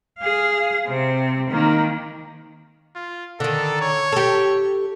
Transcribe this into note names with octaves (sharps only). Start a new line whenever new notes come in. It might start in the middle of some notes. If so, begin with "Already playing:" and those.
G#4 F5
C3 C4
D#3 A#3
F4
D3 D#3 A4
C#5
G4 A4